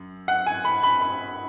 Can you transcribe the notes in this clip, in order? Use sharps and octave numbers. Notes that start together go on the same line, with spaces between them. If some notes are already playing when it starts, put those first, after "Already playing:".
Already playing: F#2
F#5
G#5
B5
B5
B5